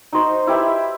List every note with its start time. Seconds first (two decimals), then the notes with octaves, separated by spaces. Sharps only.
0.13 D#4 F#4 C5
0.47 E4 G4 B4 E5